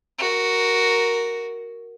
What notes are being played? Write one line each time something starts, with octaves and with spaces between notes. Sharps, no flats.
F#4 A#4